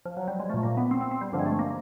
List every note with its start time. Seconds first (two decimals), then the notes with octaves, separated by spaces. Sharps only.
0.05 F3
0.17 F#3
0.28 G3
0.40 G#3
0.50 A#2 F3 A3
0.63 A#3
0.77 B3
0.91 C4
1.01 C4
1.12 C4
1.21 G3
1.32 G2 D3 F3
1.39 G#3
1.46 A3
1.59 A#3